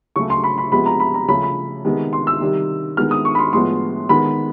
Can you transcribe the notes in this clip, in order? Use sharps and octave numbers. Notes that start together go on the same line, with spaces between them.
C#3 F#3 A3 C#6
C6
B5
B5
C3 F3 G#3 B3 B5
A#5
B5
A#5
C#3 F3 A3 B5
B5
C3 D#3 G#3 B3
C6
E6
C3 D#3 G3
D#3 G#3 B3 F6
D#6
C#6
B5
C6
A2 F3 G#3 B3 C6
D#3 G#3 B3 B5